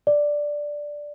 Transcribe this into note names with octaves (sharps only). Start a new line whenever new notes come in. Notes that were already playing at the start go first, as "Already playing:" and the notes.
D5